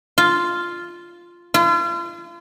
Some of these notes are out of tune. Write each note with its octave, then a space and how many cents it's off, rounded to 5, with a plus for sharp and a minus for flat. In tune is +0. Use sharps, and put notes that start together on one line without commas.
F4 -5
F4 -40